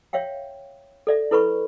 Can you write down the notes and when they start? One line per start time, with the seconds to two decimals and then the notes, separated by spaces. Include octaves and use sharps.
0.13 C#5 E5 F5 G5
1.07 A4 D5 E5
1.31 E4 A4 B4 B5 C#6